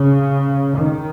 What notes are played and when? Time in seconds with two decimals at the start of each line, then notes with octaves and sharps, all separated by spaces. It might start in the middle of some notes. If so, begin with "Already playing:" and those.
Already playing: C#3
0.78 D#3